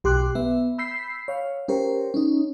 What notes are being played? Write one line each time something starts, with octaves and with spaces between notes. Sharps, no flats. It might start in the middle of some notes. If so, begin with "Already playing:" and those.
B1 G4 C6 D6 F#6
B3 E5
B5 E6 G6 B6 C7
C#5 F5
C#4 G4 A#4 C5 C#5
C#4 D#4